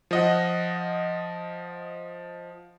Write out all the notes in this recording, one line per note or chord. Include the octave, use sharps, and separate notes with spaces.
F3 D#5 F#5